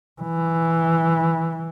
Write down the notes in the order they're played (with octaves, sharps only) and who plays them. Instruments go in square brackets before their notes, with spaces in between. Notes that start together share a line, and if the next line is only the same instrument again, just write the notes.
[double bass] E3